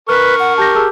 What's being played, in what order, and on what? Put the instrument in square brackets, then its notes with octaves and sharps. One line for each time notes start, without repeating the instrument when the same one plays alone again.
[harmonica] A#4 C#6 [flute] B4 [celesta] F6
[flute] F#5
[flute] G4 [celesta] A5 A#6
[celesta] G#4 A5 E6